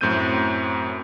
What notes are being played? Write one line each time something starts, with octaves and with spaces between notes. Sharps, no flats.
F#2 A2 C4 G6 D#7